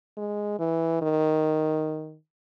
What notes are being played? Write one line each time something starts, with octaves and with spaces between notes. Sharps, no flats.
G#3
E3
D#3